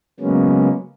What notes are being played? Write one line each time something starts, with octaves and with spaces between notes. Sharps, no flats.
C#3 F#3 G#3 A#3 B3 C#4